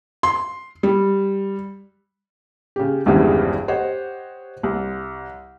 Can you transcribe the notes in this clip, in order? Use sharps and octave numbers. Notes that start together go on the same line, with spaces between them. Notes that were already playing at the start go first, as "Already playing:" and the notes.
C6
G3
C#3 G4
G#1 E2 G2 C#3 E3 G3
G4 C5 C#5 D#5 F#5
C2